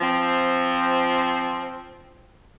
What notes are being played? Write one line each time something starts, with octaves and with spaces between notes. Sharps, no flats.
F3 C4